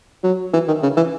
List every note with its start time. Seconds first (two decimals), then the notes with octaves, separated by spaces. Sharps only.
0.23 F#3
0.53 E3
0.67 D#3
0.83 C#3
0.97 E3